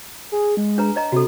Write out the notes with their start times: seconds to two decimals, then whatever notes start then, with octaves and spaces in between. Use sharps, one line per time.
0.32 G#4
0.57 G#3
0.78 D4 B4 A#5
0.96 C#5 D#5 A#5
1.12 C3 F#4 A4